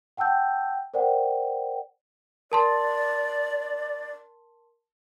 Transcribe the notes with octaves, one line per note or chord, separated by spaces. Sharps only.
F#5 G5 A5 E6 G6
A#4 C5 D5 F#5 G5
A#4 D5 A5 C6